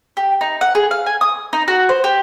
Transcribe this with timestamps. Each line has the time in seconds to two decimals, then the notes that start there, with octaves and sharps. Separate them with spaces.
0.17 G4
0.41 D#4
0.61 F#5
0.75 G#4
0.91 F5
1.06 G#5
1.21 D#6
1.53 D#4
1.68 F#4
1.89 C5
2.04 G4